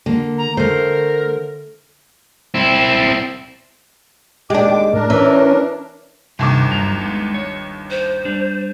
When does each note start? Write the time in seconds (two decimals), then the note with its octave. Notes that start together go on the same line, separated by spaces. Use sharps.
0.06 D3 A#3
0.38 A#5
0.57 D3 A3 A#4 C5
2.54 C4 E4
4.50 D#2 G#3 D4 G4 D6
4.93 A2 D4 A#4
5.10 E3 C#4
6.39 G1 D#2 C3 D6
6.71 G2 F#3 A#5
7.02 G#3 B3
7.34 C#5
7.91 C5
8.25 G3 D4